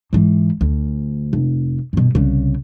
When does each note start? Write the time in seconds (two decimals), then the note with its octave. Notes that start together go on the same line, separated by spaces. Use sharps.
0.13 G#2 E3
0.61 D2
1.33 F1
1.93 G2 B2
2.15 C2 C#3